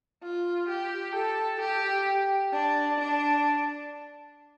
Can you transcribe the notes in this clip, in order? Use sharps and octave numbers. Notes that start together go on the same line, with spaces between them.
F4
G4
A4
G4
D4
D4